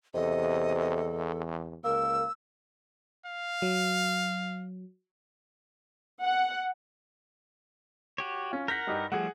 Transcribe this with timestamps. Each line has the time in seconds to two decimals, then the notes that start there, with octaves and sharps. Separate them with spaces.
0.14 E2 C3 A4 D#5
1.84 C#2 A#3 A#4 E6
3.26 F5
3.62 F#3
6.22 F#5
8.18 F#4 G4 C#5
8.51 C#4 F4
8.68 A#4 F#5 G6 A#6 B6
8.87 G2 D#4 G4
9.12 F3 G3 A3 G#4 F#5